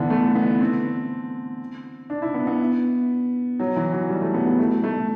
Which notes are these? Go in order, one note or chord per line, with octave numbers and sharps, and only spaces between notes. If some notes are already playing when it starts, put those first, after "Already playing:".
Already playing: D3 E3 B3
A3
B3
C4
D4
E4
B3
B3
F#3
E3
F#3
G3
A3
B3
B3
A3
A3